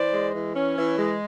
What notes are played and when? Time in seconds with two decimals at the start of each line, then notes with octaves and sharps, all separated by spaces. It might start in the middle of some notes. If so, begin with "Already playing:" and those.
Already playing: E3 C5 D5
0.13 G#3
0.34 E3
0.56 C#4
0.76 E3
0.98 G#3